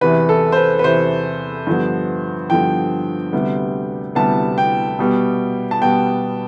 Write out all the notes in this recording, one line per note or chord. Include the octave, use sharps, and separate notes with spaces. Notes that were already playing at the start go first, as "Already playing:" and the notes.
E2 C3 E3 B4
A4
C5
B4
B4
E2 C3 E3 C5
G2 D3 F3 B3
G2 D3 F3 B3 G5
D2 C3 G3 B3
D2 C3 G3 B3 A5
G5
B2 G3 B3
A5
B2 G3 B3 G5